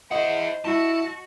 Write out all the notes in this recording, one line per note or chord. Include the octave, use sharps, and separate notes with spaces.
E4 C5 D#5 F#5
E4 F#4 A5